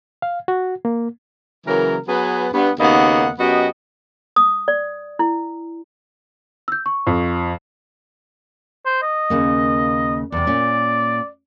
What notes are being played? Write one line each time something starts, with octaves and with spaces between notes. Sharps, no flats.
F5
F#4
A#3
C#3 E3 F#3 A#3 A#4
F#3 B3 G#4 B4
G2 B3
D#2 C#3 A#3 B3 D#5 F#5
F#2 B3 F#4 G4 D#5
D#6
D5
E4
E6 G6
C#6
F2
C5
D#5
D#2 C#3 A#3
E2 C3 D5
A#2 C#4